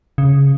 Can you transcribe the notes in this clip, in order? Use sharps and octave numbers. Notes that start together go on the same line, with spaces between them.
C#3